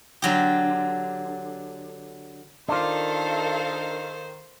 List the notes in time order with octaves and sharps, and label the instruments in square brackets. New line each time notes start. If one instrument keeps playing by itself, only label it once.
[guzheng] D3 F#3 G4
[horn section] D#3 [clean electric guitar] D4 F4 [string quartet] A4 A#4 F5 [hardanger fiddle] C5